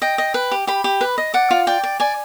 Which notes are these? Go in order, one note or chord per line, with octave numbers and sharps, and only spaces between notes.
D#5 G5
D#5
B4
G4
G4 B5
G4
B4
D#5
D5 F#5
F4
D5 G5
D5
D5 G#5